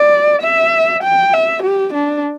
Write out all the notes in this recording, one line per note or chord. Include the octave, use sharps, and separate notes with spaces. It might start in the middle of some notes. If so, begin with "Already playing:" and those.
Already playing: D5
E5
G5
E5
G4
D4